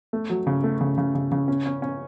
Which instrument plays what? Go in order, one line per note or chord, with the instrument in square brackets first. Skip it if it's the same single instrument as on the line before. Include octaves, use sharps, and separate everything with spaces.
[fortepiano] A3
F#3
C#3
A3
C#3
C#3
C#3
C#3
C#4
C#4
C#4